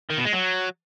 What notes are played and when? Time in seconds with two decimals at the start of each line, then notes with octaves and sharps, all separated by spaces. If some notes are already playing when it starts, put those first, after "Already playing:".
0.11 D#3
0.18 B2
0.26 G#3
0.34 F#3